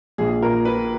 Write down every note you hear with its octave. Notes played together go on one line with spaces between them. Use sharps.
A#1 G#4
A#2 A#4
A#2 B4